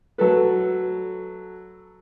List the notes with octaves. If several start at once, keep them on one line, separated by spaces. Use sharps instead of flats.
F#3 A3 A4 B4